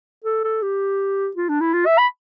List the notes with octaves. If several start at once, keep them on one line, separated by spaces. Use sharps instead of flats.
A4
A4
G4
F4
D4
E4
F4
E5
B5